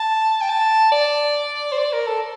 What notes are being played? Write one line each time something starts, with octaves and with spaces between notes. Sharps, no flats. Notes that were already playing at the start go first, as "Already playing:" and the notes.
Already playing: A5
G5
A5
D5
C5
D5
A#4
A4